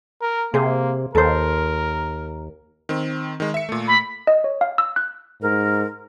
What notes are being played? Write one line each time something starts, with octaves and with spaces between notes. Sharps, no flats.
A#4
C3 A#3 G#4 C5
D#2 A4 A#4 C5
D#3 C4
D#3 G#3
E5 C#7
A#2 A3
B5
D#5
C#5
F5
E6
F#6
G#2 A#4